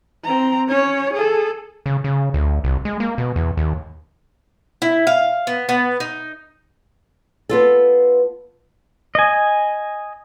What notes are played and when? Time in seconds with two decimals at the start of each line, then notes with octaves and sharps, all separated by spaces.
0.24 C4 A#5
0.68 C#4 C#5
1.13 G#4 A4
1.86 C#3
2.04 C#3
2.34 D2
2.64 C2
2.85 G#3
3.00 A#3
3.18 B2
3.36 E2
3.57 D#2
4.82 E4
5.07 F5
5.47 B3
5.69 B3
6.00 D#4
7.49 B3 F4 A4
9.15 D#5 G#5